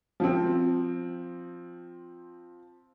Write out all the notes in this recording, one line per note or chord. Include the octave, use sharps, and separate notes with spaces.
F3 C4